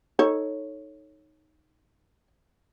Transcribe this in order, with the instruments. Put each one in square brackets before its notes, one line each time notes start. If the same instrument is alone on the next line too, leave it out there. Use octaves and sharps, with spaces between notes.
[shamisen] D#4 A4 C#5